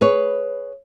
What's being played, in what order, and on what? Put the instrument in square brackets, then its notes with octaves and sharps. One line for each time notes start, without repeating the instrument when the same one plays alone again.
[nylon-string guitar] G#4 B4 C#5